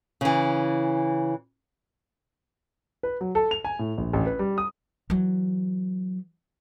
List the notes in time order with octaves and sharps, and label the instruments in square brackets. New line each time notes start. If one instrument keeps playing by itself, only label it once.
[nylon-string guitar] C#3 E3
[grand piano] B4
F#3
A4
F7
G#5
A2
A#1
A1
B4
G3
D#6
[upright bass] E3 F#3